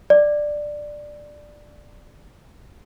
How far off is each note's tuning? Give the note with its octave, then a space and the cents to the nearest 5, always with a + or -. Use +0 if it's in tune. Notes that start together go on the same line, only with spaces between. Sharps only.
D5 +10